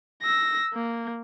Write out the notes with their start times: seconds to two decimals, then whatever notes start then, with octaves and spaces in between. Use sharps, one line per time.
0.22 E6 A#6
0.74 A#3